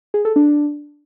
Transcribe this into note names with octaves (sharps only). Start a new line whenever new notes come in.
G#4
A4
D4